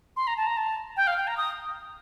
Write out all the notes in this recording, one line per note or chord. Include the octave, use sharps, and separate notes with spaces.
C6
A#5
A5
A#5
A5
G5
F5
G5
A#5
D#6